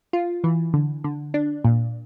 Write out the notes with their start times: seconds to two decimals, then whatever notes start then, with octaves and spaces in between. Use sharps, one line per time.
0.13 F4
0.44 E3
0.74 D3
1.04 D3
1.34 D4
1.64 A#2